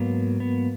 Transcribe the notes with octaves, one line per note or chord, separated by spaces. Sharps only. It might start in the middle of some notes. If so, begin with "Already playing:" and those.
Already playing: G#2 F#3 A#3 B3
B3